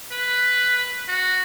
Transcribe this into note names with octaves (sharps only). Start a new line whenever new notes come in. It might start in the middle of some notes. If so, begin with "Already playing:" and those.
B4
F#4